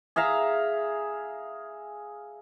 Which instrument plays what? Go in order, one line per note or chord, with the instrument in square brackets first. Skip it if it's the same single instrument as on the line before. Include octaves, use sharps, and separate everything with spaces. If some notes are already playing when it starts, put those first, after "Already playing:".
[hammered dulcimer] G#4 E5 F5 A#5